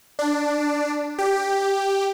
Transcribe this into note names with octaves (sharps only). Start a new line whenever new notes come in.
D4
G4